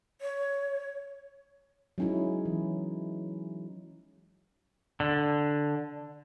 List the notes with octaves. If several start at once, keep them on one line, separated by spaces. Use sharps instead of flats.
C#5
F#3 G#3 C#4 D#4 E4
E3
D3